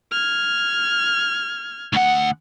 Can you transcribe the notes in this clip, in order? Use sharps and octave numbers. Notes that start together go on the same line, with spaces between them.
F6 G#6
D2 F#5